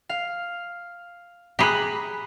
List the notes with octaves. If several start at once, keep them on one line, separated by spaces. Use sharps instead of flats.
F5
G4 G#4 A#5 B5 F#6